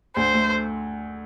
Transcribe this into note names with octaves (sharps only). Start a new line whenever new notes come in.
D2 C5
A3